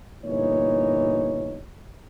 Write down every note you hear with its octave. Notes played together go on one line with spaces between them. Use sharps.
G1 A#2 E3 D#4 C#5